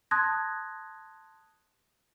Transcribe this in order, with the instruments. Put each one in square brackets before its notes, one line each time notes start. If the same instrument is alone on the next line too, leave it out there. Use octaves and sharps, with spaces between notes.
[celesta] A5 C6 D#6 F#6 G#6 A#6